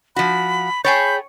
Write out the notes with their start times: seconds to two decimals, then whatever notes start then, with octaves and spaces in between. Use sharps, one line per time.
0.16 F3 F#4 B5
0.85 G#4 C#5 G5 A5 B5 G6